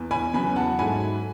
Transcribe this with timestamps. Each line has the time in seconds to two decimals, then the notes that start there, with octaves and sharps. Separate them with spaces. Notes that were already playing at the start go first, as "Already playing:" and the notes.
Already playing: E2 B3
0.11 G#5 B5
0.34 E2 C#3 F#3 B3 G#5 B5
0.56 F#5 A5
0.79 G#2 F#3 A3 G#5 B5